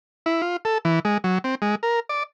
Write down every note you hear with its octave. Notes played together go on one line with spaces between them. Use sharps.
E4
F4
A4
E3
G#3
F#3
C4
G#3
A#4
D5